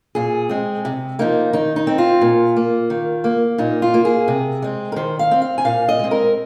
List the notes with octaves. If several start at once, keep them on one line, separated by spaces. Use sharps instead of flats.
A#2 G#4
G#3 C4
C3
F3 A#3 D#4
D#3 D#4
D#4
C4
F4
A#2
A#3
D#3
A#3
A#2 D#4
F4
A#3
G#4
C3
G#3 C4
A#4
D#3 C5
F5
C4
F5
G#5
A#2 F5
D#5
G#3 C4
A#4